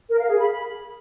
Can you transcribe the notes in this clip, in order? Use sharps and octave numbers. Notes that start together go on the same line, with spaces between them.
A#4
F5
G#4
B5